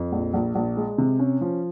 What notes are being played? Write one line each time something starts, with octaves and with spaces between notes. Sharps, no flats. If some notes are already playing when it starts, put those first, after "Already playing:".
Already playing: F2
A#1
A#1
A#1
G#3
C3
C#4
F3